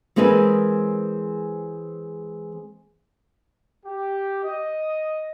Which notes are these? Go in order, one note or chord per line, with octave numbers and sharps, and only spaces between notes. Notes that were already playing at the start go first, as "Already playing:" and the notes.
E3 G#3 C4 G#4 A#4 B4
G4
D#5